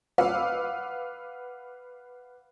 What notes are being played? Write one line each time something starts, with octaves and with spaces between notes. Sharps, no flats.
B4 F5 F#5 D6 E6